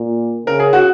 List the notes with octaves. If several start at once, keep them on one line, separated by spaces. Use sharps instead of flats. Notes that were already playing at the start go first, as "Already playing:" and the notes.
Already playing: A#2
C#3 A#4
G#4
F#4